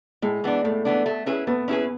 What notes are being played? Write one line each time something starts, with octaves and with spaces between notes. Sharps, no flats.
A2 G#3
E3 B3 D4
A2 A3
E3 B3 D4
A3
C#4 E4 G#4 B4
A3 B3
C#4 E4 G#4 B4